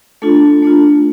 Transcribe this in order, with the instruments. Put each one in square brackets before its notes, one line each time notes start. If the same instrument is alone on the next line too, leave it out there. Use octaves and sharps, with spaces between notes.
[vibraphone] A3 D4 F4 A4
A3 D4 F4